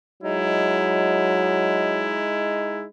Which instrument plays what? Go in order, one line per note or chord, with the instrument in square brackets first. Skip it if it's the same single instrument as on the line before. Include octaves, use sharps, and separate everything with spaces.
[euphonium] F#3 [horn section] G#3 D#4 E4